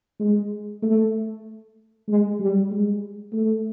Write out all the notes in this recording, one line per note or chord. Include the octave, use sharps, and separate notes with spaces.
G#3
A3
G#3
G3
G#3
A3